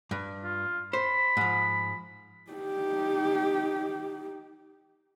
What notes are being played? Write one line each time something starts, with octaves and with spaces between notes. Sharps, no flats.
G2
F4
C5 B5
G#2 F3
D#4 G4